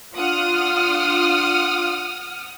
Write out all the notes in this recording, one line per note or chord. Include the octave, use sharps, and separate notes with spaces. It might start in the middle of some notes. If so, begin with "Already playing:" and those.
D4 F4 F#5 D#6 F6